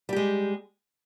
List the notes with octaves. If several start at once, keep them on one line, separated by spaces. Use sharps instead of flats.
G3 G#3 G4